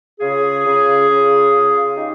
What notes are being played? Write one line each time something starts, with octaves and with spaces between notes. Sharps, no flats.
C#3 F4 G#4
C#3
C#3
C#3
D#4 G4